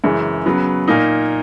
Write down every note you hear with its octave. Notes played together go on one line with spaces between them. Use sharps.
F#2 C#3 E3 G#3
C#3 F#3 B3
A#2 A#3 D#4